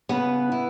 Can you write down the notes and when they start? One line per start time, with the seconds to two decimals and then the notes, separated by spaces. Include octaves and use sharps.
0.09 C#3 B3 B4
0.52 E4